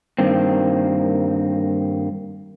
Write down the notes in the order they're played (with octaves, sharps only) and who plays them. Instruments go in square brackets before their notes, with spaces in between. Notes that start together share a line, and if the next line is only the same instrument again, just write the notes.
[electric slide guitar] G2 D#3 A#3 C4